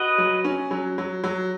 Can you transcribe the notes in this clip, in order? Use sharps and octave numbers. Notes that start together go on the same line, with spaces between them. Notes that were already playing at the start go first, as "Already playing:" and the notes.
Already playing: F#4 B4 D#5
F#3
C#4
F#3
F#3
F#3